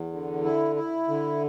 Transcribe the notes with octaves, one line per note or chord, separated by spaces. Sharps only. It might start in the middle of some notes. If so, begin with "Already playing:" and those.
Already playing: E2
D3
E4
E4
D3